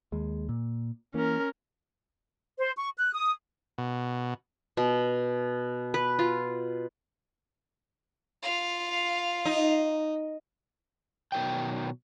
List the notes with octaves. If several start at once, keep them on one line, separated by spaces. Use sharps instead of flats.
D#2 G#3
A#2
E3 A#3 C#4 A#4
C5
C#6
F#6
D#6
B2
B2
B4
F4
F4 F5
D#4
B2 D#3 F#3 G5